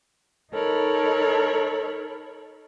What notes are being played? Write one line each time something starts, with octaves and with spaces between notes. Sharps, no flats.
D#4 A4 A#4 C#5 B5